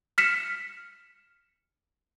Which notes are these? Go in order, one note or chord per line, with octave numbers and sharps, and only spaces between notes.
F6 B6 C#7 E7